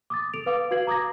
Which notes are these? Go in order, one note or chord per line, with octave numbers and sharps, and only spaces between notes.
D6 D#6 A6
A4 D7 F7
B4 F5 D6 D#6
F#4 B4 F5 G#6 C7 F#7
A#5 D6 D#6 G#6 A#6